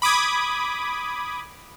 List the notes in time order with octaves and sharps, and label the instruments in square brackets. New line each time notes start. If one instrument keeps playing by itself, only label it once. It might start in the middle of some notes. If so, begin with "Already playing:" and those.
[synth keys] B5 D6 D#6 G#6